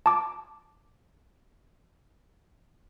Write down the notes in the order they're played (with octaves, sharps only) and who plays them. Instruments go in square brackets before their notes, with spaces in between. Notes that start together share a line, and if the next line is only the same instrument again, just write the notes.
[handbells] A5 D6